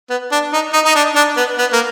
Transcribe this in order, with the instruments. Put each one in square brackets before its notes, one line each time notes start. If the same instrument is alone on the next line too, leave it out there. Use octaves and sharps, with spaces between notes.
[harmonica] B3
D4
D#4
D#4
D#4
D4
D4
B3
B3
A#3